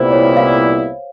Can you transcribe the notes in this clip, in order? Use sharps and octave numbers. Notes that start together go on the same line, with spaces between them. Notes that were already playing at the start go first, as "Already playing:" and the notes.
Already playing: C2 A#2 G3 B3 E4 C5
C#5
F5